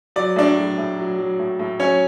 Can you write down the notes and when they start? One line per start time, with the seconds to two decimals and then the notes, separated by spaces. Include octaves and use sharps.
0.16 F#3 D5
0.36 A2 D4 D5
0.57 F#3
0.78 A2
0.99 F#3
1.18 F#3
1.39 A2
1.60 A2
1.80 F#3 C#4 C#5